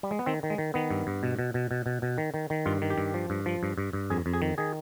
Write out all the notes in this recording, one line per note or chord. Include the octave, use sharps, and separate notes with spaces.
G3
G#3
B3
D#3 C4
D#3
G#3
D#3
D#3 B3
G2
G2
B2
B2
B2
B2
B2
B2
D#3
D#3
D#3
G2 F4
D#3
G4
G2
F3
G2
F3
G2
G2
G2
F2 G#4
F2
G#4
D#3
D#3 G#4